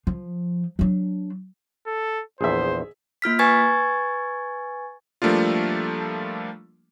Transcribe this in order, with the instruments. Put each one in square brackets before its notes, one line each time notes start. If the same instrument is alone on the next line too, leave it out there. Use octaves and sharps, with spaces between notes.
[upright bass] F3
F#3 D4
[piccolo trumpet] A4
[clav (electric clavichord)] A#1 E2 [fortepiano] G#4 E5 [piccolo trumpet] C5
[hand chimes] A#3 F4 F6 B6
B4 G#5 C#6 G#6 A6
[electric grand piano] F3 G3 A3 A#3 D4 F4